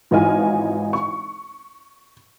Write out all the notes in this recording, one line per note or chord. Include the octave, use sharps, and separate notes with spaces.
G#1 E3 D#4 F4 G#5 F6
C#6